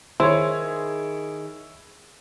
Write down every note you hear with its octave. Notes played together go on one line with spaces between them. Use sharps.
D#3 E4 G#4 C5 C#5